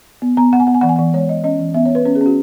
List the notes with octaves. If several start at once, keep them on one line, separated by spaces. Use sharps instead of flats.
B3
B3 A#5
B3 F#5
G#5
B3 F#5
G#5
E3 F#5
G#5
E3 F#5
G#3 C#5
G#3 D#5
C#4 D#5
E3
B3 E5
C#5
B3
B4
C#4 B4
G#4
C#4
F#4